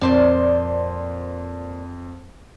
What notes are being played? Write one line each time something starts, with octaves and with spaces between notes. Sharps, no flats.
F2 A#2 C5 D5